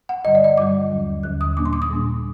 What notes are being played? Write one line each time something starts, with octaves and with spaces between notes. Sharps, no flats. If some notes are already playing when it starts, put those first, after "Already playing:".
F#5
G2 D3 G3 D#5
D5
D#5
G2 D3 G3 D6
D#2 D3 F#3
D#2 D3 F#3 F#6
D#6
A#2 G3 A#3 D4 D6
C6
D6
D#6
A#2 G3 A#3 D4